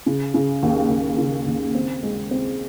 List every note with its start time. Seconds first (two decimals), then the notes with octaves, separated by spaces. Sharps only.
0.06 C#3
0.34 C#3
0.63 D#2
0.90 D#2
1.18 C#3
1.46 D#2
1.75 C4
2.03 G#3
2.31 C4